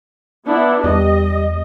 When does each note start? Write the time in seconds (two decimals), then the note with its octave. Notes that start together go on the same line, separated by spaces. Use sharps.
0.45 B3 D4 E4
0.84 E2 G3 D#5